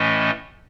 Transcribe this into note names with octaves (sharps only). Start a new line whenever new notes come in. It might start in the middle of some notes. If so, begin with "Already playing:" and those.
Already playing: A2 E3 A3 C#4 D#5